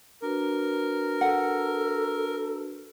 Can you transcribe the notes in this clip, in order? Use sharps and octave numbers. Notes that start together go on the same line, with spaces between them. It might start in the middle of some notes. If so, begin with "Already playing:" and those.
D4 F#4 A#4 B4
A4 F#5